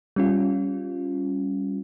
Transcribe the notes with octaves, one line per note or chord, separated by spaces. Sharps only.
G3 C#4 F4